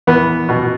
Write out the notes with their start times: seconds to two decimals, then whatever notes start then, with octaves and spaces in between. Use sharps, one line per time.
0.07 E2 B3
0.49 B2